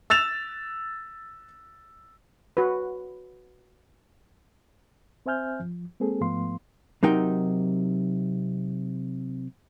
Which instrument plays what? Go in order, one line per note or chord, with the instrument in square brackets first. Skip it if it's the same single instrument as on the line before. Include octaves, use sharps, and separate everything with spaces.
[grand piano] E6 A6 E7 F7
[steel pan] F#4 B4
[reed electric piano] C4 C5 E5 G#5 F6 G6
F3
G#3 A#3 C4 G#4 A4
G#2 F3 A3 B3 F5 C6
[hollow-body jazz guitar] C3 F#3 D#4 A#4 G5